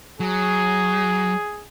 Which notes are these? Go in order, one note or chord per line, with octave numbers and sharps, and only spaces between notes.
F#3 G#4